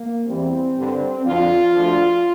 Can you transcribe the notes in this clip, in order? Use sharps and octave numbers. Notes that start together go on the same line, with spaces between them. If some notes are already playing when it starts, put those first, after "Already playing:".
Already playing: A#3
E2 E3 G3 C4
G2 D3 G3
F2 D3 F3 F4
D2 D3 F3